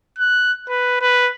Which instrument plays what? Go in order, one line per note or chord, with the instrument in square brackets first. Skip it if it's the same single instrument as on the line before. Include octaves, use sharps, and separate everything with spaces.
[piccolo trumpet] F#6
B4
B4